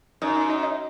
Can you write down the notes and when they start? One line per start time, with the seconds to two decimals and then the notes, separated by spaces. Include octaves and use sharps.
0.22 F#2 D#4 D#5
0.36 D#4 D#5
0.50 D#4 D#5
0.63 D#4 D#5